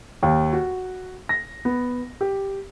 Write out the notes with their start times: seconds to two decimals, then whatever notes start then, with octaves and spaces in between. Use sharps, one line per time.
0.23 D#2
0.53 F#4
1.29 A#6
1.65 B3
2.21 G4